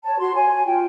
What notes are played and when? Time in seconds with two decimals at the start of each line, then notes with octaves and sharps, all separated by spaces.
0.04 C#5 A5
0.19 F#4 C6
0.35 C#5 G#5
0.50 F#4
0.65 F4 G5